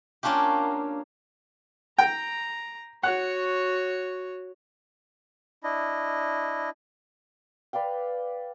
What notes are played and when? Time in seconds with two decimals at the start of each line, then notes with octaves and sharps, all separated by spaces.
0.23 A#3 C#4 D4 F4 G4
1.98 G5 A#5
3.03 F#4 C#5 F#5
5.63 D4 E4 D#5
7.73 B4 D5 F5 G5